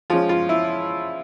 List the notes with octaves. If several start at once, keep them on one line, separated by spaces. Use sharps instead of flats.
F3 G#3 C#4 F4
F4
E4